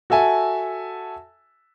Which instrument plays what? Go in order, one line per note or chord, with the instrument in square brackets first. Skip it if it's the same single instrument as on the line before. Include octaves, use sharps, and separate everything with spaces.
[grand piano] F#4 A4 E5 G#5 A5